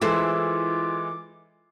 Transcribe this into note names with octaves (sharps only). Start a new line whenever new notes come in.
E3 G#3 E4 F4 A4 C5 D6